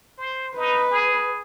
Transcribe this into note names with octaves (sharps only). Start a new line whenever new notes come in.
C5
D#4 B4
G#4